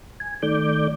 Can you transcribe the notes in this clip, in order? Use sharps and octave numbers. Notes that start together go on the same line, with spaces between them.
G#5
D#3 A3 D5 D6 G6